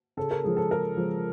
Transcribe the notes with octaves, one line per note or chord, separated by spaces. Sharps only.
C#3 A4
A#4
F3 G#3 G#4
A4
C#3 A#4
F3 G#3